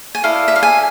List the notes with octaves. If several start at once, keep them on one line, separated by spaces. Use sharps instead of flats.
G#5
E4 A4 D5 F5
E5
F5
G#5